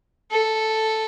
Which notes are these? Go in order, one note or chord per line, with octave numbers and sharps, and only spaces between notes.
A4